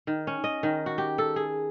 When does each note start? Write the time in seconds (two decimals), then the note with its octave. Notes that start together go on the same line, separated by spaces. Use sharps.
0.07 D#3
0.27 C#4
0.44 D#5
0.63 D#3
0.86 F#4
0.98 G4
1.18 A4
1.36 G#4